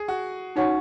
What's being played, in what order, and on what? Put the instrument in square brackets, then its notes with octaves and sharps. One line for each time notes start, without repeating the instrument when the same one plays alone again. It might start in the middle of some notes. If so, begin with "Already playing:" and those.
Already playing: [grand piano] G#4
F#4
[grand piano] C#4 [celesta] D#4 F#4 C#5 F#5 C#6